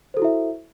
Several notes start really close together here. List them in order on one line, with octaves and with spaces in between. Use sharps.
C5 A4 F#4 E4 E5